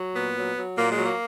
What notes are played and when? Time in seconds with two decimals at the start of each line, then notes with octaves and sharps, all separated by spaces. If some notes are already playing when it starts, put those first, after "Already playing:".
Already playing: F#3
0.14 A#2 B3
0.35 F#3
0.56 F#3
0.77 A#2 A#3
0.91 G#3
0.98 F#3
1.04 A#3